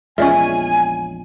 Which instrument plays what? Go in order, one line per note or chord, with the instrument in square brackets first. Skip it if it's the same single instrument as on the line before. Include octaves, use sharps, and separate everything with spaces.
[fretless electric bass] A#1 E2 G#3 [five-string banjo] C#4 D5 E5 [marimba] F4 [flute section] G#5